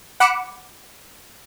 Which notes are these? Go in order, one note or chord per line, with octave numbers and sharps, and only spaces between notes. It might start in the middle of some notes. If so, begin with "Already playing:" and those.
F#5 B5 D6 C#7 E7